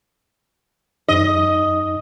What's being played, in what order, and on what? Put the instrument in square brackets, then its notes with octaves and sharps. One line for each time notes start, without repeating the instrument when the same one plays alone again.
[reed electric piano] F#2 D#4 [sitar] D#5